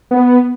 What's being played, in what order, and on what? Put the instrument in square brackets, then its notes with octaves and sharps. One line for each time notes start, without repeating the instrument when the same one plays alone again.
[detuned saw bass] B3